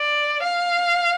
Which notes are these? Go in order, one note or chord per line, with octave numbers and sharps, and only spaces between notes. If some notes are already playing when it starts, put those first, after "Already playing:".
Already playing: D5
F5